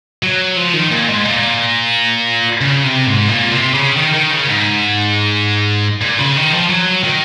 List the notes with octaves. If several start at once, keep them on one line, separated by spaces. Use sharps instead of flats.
F#3
F3
D#3
A#2
G#2
A#2
C#3
C3
G#2
A#2
C3
C#3
D#3
D#3
C#3
G#2
A#2
C#3
D#3
F3
F#3
D#3